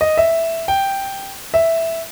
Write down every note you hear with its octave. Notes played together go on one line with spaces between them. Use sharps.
D#5
E5
G5
E5